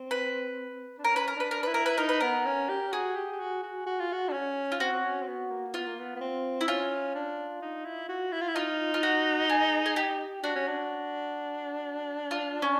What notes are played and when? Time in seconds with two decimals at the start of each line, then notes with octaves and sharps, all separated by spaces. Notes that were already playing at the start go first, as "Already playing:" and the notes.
Already playing: C4
0.11 B4
0.98 D4
1.04 C#4 A#4
1.16 B4
1.28 A#4
1.36 D4 B4
1.51 A#4
1.63 E4 B4
1.74 A#4
1.86 B4
1.98 D#4 A#4
2.09 B4
2.21 B3 A#4
2.45 C#4
2.69 G4
2.92 F#4 G#4
3.16 G4
3.32 G4
3.40 F#4
3.63 F#4
3.86 F#4
3.99 F4
4.12 F#4
4.28 D4
4.33 C#4
4.72 F4
4.80 C4 F#4
4.93 C4
5.04 C#4
5.22 C4
5.27 B3
5.50 A#3
5.74 B3 F4
5.87 A#3
5.99 B3
6.16 B3
6.21 C4
6.61 E4
6.68 C#4 F4
7.15 D4
7.62 D#4
7.85 E4
8.09 F#4
8.32 E4
8.41 F4
8.48 E4
8.56 D#4 F4
8.94 F4
9.03 F#4
9.49 G#4
9.86 G#4
9.96 G4
10.43 D4 F#4
10.55 C#4
10.68 D4
12.31 F4
12.62 C#4